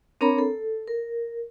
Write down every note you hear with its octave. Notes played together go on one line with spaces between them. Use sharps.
C4 D4 A#4 C#5 A#5 B5
A4
A#4